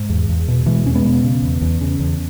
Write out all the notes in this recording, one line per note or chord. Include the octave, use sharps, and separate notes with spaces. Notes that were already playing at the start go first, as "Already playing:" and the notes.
Already playing: G#2
E2
E2
B2
B2 E3 G#3
E2 C#4
G#3 B3
B2
C#3
E2
E2
C#3
E2